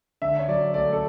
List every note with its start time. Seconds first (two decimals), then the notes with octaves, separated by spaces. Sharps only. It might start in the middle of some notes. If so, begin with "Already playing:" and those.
0.22 D3 E5
0.39 C#5
0.48 F#3 D5
0.74 A3 D5
0.93 A4